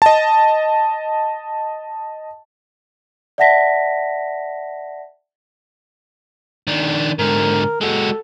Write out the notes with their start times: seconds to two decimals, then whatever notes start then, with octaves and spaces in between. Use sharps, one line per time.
0.02 D#5 A5
3.38 D5 E5 F#5 A5 A#6 B6
6.67 D#3 D4
7.19 G#2 D3 A#4
7.81 G#3 F#4 A4